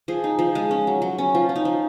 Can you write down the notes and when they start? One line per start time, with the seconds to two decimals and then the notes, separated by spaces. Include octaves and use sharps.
0.08 F3 G#4
0.24 D#4
0.39 F3
0.55 G#3
0.71 C#4
0.87 F#3
1.02 F#3
1.18 C#4
1.34 F3 F4
1.49 C#4
1.56 D#4
1.65 F3